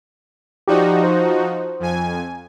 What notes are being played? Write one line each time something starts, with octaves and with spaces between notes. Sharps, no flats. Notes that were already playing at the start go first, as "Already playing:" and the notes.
F3 D#4 F#4 G4 D5
C5
F2 G#5